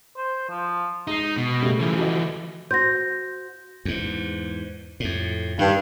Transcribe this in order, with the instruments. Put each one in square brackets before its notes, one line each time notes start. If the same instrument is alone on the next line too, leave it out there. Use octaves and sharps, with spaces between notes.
[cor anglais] C5
F3
[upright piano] G#3 C7 [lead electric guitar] D#4
[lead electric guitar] B2
[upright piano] C#3 G3 A3
[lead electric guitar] E3 F3
[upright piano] F#4 A4 D#5
[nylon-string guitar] F#4 C5 [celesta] G6 A#6
[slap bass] E2 G#2
F2 A2
[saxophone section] G2 [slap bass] D#3